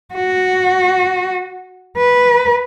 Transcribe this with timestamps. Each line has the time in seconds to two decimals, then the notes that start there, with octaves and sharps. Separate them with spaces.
0.14 F#4
1.98 B4